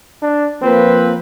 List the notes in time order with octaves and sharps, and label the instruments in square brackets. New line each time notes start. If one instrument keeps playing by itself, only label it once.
[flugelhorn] D4
[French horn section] F3 A#3 B4 [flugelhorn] C4